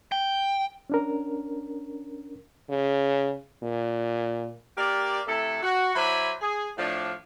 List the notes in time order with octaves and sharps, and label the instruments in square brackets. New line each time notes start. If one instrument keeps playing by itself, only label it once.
[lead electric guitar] G5
[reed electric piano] C#4 D4 A#4
[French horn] C#3
A#2
[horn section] A#3 G4 A#4 D5
C3 A3 E4 A4
F#4
F#3 E4 C5 D5 G#5 B5
G#4
A2 F3 D4